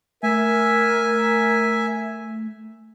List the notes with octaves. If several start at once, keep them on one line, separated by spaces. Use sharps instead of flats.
A3 A#4 E5 G#5